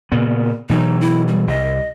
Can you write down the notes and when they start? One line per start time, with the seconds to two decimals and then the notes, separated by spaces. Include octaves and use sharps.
0.12 A#2 C#3 B3
0.69 B2 E3 F#3 D#4
1.01 E4
1.28 G3
1.47 C2 D#5